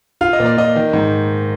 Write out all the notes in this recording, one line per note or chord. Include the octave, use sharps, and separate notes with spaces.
F4 F5
D#5
A#2
D5
A#2 D#5
D#3
G#2